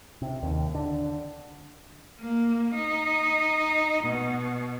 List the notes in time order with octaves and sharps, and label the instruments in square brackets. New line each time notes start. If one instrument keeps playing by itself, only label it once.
[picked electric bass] C3
D#2
D3
[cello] A#3
D#4
B2